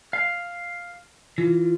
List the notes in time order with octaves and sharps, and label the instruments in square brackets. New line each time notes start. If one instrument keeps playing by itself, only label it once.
[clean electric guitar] F5
[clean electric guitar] E3 [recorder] F4